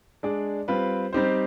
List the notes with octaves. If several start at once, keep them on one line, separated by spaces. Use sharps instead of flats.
G#3 D4 G#4 D5
G3 C4 F4 B4
G3 C4 D#4 G4 C5